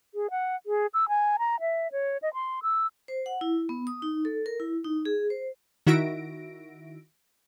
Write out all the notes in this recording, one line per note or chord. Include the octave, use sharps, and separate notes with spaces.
G#4
F#5
G#4
E6
G#5
A#5
E5
C#5
D#5
C6
E6
C5
F#5
E4
B3
D#6
D#4
A4
A#4
E4
D#4
G#4
C5
D#3 E4 F#4 E5 A#6 D7